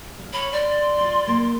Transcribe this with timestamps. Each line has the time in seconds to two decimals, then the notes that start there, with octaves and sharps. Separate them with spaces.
0.19 F5
0.33 C#5 B5
0.52 D5 C6
1.01 F4
1.27 A#3